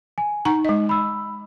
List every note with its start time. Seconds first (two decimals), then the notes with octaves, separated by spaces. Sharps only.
0.18 G#5
0.45 D#4 F#5 A#5 C#6
0.65 G#3 D#5
0.89 B5 E6